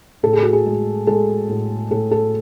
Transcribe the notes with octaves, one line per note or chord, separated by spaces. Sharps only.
A2 A4
G#4
F#4
G#4
G#3
G#3 A4
A2
A2 A4
A4